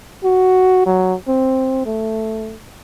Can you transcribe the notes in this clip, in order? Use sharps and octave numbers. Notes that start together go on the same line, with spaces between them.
F#4
F#3
C4
A3